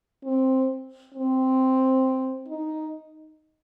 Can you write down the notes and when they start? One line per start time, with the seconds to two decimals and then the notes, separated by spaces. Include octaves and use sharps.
0.25 C4
1.14 C4
2.48 D#4